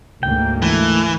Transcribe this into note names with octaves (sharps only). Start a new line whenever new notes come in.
D2 G#2 A#3 G5
E3 A3